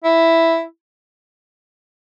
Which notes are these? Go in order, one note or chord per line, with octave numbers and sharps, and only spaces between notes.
E4